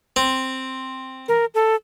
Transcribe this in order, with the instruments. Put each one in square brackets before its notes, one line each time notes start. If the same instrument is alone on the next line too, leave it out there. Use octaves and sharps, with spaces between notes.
[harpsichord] C4
[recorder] A#4
A4